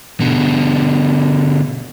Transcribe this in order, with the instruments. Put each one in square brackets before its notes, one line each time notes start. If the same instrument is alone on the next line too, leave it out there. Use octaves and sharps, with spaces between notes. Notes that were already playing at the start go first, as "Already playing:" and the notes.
[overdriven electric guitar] B2 D3